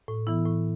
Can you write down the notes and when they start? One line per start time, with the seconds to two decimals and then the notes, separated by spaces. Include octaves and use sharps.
0.08 A2
0.27 E3 B3 E4
0.46 A2